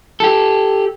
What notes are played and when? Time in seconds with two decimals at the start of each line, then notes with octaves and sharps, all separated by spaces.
0.20 G4 A4